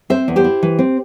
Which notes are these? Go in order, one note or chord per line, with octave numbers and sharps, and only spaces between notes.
C4 C5 E5
E2
G4 C5
E4
E3
C4